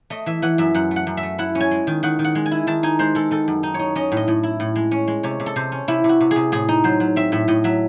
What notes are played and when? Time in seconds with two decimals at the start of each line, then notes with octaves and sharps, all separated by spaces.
0.10 A3 D#5
0.26 E3 E5
0.42 E3 F#5
0.58 F#2 E5
0.75 F#2 F#5
0.91 A3
0.96 F#5
1.07 F#2
1.17 E5
1.23 A3
1.38 E4 F#5
1.55 C#4
1.60 G#5
1.71 G#3
1.87 D#3
2.03 D#3 F#5
2.19 D#3
2.25 F#5
2.35 G#3
2.46 G#5
2.51 E4
2.67 D#3 A5
2.83 D#4 G#5
2.99 G#3 C5
3.15 G#3 A4
3.31 D#3 A4
3.48 F#2
3.63 D#4
3.74 C#5
3.79 D#4
3.95 C#4 D#5
4.12 A2
4.17 D#5
4.28 A2
4.43 E4
4.60 A2
4.76 G#3
4.91 C#4
5.08 G#3
5.23 C3 C#5
5.40 C3
5.46 A4
5.56 C3 C5
5.72 C#4
5.88 C3 E4
6.04 C3 F#4
6.21 C3
6.31 G#4
6.36 C3
6.52 A2 G#4
6.69 D#4
6.84 F#3 C5
7.00 F#3
7.16 C4 E5
7.32 A2 E5
7.48 A2 D#5
7.64 F#3 E5